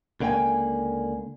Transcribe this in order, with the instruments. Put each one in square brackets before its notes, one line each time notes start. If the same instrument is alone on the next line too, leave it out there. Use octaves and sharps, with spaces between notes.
[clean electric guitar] C#2 D3 A#3 F5 G5 G#5